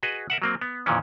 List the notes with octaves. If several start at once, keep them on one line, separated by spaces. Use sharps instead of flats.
F#4 G#4 B4 D#5
A#4 E5 F#5
F#3 A#3 C4
B3
F2 A#2 D#3 E3 C#4